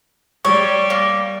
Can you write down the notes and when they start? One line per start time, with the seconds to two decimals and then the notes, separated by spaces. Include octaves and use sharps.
0.45 G3 C#5
0.90 A#3